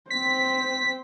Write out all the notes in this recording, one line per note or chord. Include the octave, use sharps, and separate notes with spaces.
C4 C5 B6